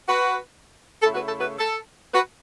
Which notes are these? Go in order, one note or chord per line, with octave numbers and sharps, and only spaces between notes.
F#4 B4
C#3 A3 E4 A4
F#4 B4
A4
F#4 B4
A4
F#4 B4